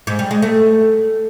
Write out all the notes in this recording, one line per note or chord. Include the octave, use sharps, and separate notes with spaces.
G#2
G3
G#3
A3